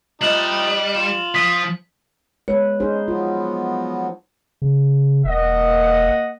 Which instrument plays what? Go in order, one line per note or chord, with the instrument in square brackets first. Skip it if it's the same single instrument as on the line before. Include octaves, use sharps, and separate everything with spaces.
[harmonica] F3 D#4 [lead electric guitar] G3 [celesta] D#5 F#6 E7 [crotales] F#7
[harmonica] F4 [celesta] E7
[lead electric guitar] F3 [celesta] D#6 [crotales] B6
[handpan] G#3 B4 [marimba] C#5
[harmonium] C#4 [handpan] D#4 G#4 C5
[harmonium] F3 F#3 B3 [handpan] F4
[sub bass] C#3
[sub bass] E1 [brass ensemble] A#3 D#5 F#5